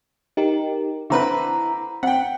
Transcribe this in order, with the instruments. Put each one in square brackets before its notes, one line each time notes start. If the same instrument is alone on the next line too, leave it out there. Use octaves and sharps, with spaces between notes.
[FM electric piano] D#4 G4 A#4
[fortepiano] D3 C4 B4 [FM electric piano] E4 A#5
[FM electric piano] C4 [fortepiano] F#5 G5